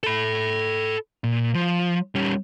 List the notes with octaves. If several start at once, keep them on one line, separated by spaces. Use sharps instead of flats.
A4 B5
A#2
F3
G3 C#4